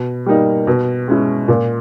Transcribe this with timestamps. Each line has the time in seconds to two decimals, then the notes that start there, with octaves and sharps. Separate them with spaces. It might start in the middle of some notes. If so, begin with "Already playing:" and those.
Already playing: B2
0.26 G3 A#3 D#4
0.67 B2
1.08 G#3 C#4 E4
1.48 A#2